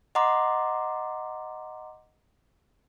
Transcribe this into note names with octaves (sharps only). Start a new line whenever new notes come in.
D#5 F#5 A#5 C6 D6